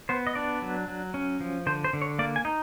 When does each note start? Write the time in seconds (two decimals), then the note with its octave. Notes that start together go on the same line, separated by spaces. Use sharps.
0.09 B3 C5
0.27 D#5
0.35 D4 D5
0.62 F#3
0.88 F#3
1.14 C#4
1.40 F3
1.67 D3 C5
1.84 C5
1.93 D3
2.02 C#5
2.19 A#3 D5
2.36 G#5
2.45 D#4